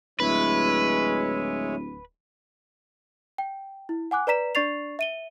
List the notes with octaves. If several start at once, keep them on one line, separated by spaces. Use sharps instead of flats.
D1 G#3 E4 B4 C#5
G5
E4
F#5 G#5 D6 F#6
B4 D5 A#5 B6 E7
D4 D5 C#6 A6 C7 F7
E5 D#7 G7